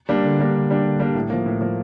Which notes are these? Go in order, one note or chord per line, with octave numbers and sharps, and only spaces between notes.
G3 A#3 D4
D3
G3 A#3 D4
D3
G3 A#3 D4
D3
G3 A#3 D4
A2
F3 A#3
A2
F3 A#3